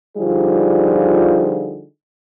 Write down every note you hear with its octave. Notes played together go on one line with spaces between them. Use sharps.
D3 F3 G3 D#4 F4 G#4